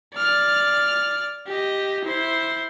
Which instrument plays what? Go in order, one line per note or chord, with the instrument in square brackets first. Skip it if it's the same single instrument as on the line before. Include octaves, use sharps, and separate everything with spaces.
[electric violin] D5 F6
G4 D#5
E4 C5